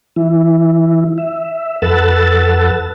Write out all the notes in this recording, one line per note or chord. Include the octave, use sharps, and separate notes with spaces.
E3 E4
E5
F2 A4 B4 F#5 E6 A6